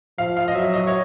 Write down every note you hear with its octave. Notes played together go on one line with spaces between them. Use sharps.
F3 F5
F5
D#5
F#3 E5
D#5
C#5